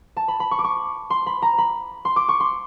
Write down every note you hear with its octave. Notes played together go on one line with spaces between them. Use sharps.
A5
B5
B5
C#6
D6
C#6
C6
B5
A#5
B5
C6
D6
C#6
C6